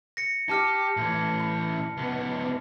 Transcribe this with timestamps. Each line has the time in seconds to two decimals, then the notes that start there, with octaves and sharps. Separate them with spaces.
0.17 A#6 C#7
0.49 G4 A5 F6 C#7
0.97 A2 E3
1.40 B5
1.97 C#2 B3